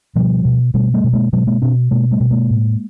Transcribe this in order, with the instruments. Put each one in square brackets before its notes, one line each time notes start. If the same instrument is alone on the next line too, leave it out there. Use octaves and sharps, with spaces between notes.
[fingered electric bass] B2 F3 G3
B2
B2 G3 A3
G3 A3
B2
G#3 A#3
B2 F#3 G#3
G#3 A#3
B2 C4 D4
B2 G#3 A#3
G3 A3
B2
G#3 A#3
A2